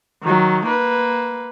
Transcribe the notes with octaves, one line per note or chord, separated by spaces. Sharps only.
D#3 F#3
A#3 B4